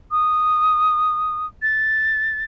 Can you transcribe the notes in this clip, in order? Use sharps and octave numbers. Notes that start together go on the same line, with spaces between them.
D#6
A6